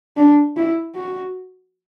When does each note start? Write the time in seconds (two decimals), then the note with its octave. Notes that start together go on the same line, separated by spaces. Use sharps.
0.17 D4
0.57 E4
0.95 F#4